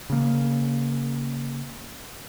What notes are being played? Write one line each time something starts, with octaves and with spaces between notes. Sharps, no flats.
C#3 A#3